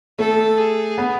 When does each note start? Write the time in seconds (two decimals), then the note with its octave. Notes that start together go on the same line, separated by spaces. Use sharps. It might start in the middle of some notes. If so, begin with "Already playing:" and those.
0.19 A3 A4
0.58 G#4
0.98 B3